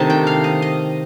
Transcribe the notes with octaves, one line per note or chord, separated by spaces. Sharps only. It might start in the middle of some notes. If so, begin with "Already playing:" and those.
Already playing: C3 D#3 A3 D4 A5
G5
F5
D#5
D#5